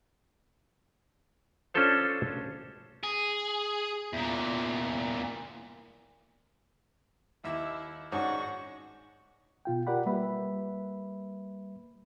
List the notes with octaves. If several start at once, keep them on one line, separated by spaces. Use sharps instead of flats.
C#4 D4 F4 A4 C5 C#5
G#4
E2 A#2
D#2 E4 E5
G#2 C#4 D4 F#4 C#6
B2 F4 G5
F4 G4 A#4 D5 F#5 B5
G3 A#3 B4 E5 B5